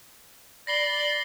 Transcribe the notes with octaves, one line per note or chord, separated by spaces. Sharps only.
D5 B5 A#6 C7 G7